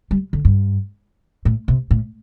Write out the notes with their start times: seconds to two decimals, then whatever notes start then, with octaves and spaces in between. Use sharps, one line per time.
0.11 G3
0.33 D3
0.45 G2
1.45 A2
1.68 C3
1.91 A2